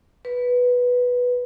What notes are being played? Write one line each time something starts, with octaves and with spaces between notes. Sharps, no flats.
B4